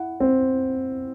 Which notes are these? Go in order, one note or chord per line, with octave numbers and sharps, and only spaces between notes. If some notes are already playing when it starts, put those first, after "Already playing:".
Already playing: E4 F#5
C4